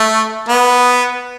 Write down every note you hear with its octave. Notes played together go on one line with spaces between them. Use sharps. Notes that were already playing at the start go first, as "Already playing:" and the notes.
Already playing: A3
B3